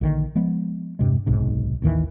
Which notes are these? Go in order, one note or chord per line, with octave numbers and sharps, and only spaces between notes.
A#1 D3 D#3
F3 G#3 B3
E1 G2 C3 G#3
D1 B1 G#2 C3
A1 D#2 D#3 E3